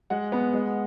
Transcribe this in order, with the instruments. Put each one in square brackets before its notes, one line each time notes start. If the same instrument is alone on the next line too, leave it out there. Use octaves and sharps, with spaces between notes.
[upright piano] G#3 F#5
B3
G#3